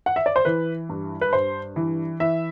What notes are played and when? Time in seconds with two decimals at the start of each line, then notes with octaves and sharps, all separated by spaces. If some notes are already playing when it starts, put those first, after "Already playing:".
0.06 F#5
0.16 E5
0.26 D5
0.36 C5
0.45 E3 B4
0.89 G2
1.21 B4
1.33 G2 C5
1.76 E3
2.20 E3 E5